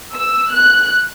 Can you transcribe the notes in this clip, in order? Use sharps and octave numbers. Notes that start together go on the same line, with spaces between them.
E6
F#6